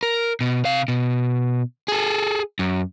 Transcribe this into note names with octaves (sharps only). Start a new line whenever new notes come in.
A#4
B2
C3 F5
B2
G#4 A4
F#2